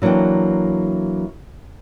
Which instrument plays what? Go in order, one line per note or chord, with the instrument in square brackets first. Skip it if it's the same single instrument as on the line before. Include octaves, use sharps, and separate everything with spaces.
[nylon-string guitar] E3 F#3 A#3 D4 G5